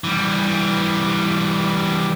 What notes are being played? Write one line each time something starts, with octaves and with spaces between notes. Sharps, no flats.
E3 G3